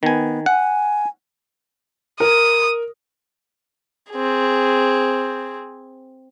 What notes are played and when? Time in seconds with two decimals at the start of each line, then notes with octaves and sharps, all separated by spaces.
0.03 D#3 B3 G#5
0.46 F#5 G#5
2.20 A#4 D#6
4.11 C4 G#4